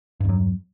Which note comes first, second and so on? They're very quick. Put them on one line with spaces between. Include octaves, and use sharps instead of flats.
G2 E2 F#3